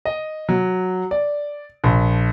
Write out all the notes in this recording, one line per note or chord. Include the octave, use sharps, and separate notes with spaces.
D#5
F#3
D5
A#1